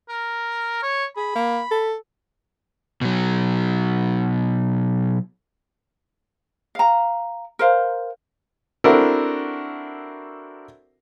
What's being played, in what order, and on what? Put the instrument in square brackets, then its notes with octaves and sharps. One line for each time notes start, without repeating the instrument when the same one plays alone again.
[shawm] A#4
C#5
[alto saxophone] G#4 [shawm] B5
[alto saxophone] A#3
A4
[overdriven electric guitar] B2 F#3
[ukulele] F5 A#5
A#4 C5 F5
[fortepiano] C4 D4 E4 F#4 A4 A#4